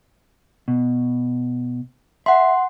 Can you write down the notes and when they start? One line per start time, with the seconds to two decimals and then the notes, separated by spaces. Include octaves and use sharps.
0.68 B2
2.26 E5 F#5 C6